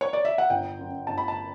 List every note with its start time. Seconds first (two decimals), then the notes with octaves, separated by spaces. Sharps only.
0.01 C#5
0.13 D5
0.25 E5
0.38 F#5
0.50 G1 G5
0.79 F#2
1.07 G1 A5
1.18 B5
1.28 A5